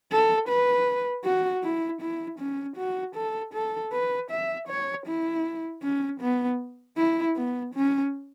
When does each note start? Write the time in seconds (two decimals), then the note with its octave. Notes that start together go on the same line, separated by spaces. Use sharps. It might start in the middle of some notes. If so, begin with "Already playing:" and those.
0.11 A4
0.48 B4
1.24 F#4
1.63 E4
2.01 E4
2.39 C#4
2.77 F#4
3.15 A4
3.54 A4
3.93 B4
4.31 E5
4.68 C#5
5.06 E4
5.83 C#4
6.21 B3
6.97 E4
7.36 B3
7.74 C#4